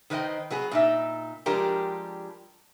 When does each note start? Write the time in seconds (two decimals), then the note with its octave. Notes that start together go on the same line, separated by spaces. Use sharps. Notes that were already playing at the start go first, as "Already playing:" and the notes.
0.10 D#3 B4 C5 D#5 G5
0.50 F#3 B3 G#4
0.71 A#2 D#4 E5
1.46 F3 G3 G#3 D4 G4 A#4